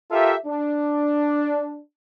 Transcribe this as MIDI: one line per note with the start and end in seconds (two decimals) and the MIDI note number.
0.11 0.34 65
0.11 0.34 67
0.11 0.34 69
0.11 0.34 70
0.11 0.34 76
0.47 1.78 62